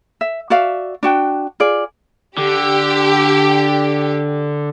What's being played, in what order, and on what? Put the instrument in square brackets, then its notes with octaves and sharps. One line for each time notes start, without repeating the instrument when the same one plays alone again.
[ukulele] E5
F#4 D5 E5 F5
D4 F#4 G5
F4 G#4 D5
[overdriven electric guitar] D3 [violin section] G4